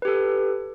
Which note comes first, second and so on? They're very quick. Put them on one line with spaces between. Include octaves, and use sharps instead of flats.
B4 G4 A4